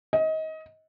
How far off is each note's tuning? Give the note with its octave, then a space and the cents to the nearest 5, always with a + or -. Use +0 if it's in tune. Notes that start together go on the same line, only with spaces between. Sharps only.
D#5 +25